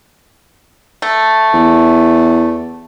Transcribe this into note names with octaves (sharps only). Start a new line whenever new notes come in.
A3
E2